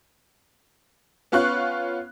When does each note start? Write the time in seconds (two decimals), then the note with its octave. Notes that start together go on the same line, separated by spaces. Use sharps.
1.32 B3 C#4 F4 C#6 F#6